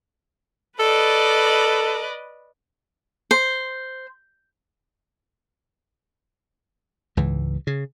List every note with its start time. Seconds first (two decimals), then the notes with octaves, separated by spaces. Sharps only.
0.80 A4 B4 D5 D#5
3.31 C5
7.17 C#2 G#2 E3
7.67 C#3